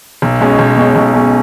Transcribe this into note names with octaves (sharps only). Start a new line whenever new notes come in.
B1
B2 G#3 C#4
B1
B2 G#3 C#4
B1
B2 G#3 C#4